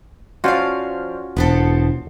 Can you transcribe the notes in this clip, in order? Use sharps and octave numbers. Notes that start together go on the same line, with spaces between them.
F3 C#4 D4 F4 F#4 F5
E1 B3 C4 A4